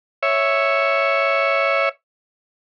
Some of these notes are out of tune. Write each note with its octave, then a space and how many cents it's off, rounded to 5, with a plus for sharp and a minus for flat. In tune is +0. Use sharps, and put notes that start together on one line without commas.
C#5 +0 E5 +0